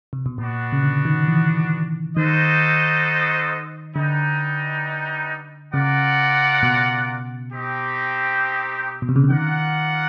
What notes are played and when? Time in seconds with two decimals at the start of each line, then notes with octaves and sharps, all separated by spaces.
0.13 C3
0.26 B2
0.38 A#2 B3 D4 F#4
0.72 C#3
0.83 D3
1.05 D#3
1.28 E3
2.17 D#3 D#4 F#4 A4 C5 D#5
3.95 D3 G3 B3 D#4
5.74 C#3 F4 A#4 D5 F#5
6.63 B2
7.53 C4 D#4 G4
9.02 B2
9.09 C3
9.16 C#3
9.24 D3
9.30 D#3 F4 A#4 D5 F#5